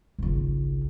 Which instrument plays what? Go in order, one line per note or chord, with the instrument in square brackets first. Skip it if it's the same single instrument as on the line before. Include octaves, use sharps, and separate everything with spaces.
[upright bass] G#1 C#2